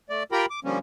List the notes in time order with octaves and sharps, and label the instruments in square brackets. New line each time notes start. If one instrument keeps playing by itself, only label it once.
[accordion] A3 D5
F4 G4 A#4 G5 A#5 B5
D6
D3 F3 G3 A#3 C#4